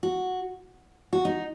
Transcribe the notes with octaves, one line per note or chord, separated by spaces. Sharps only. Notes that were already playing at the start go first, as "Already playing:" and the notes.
F#4
F#4
D#4